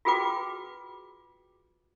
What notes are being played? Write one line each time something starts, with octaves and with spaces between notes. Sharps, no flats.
F4 F#4 G#4 B4 G5 D6